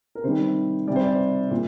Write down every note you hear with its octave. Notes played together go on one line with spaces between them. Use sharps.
A#4
C3 D#3 G3 C5
C3 G3 D5
C5
D5
A#2